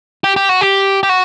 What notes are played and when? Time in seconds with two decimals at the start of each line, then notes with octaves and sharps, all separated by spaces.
0.24 G4
0.36 G4
0.49 F#4
0.61 G4
1.03 G4
1.09 F#4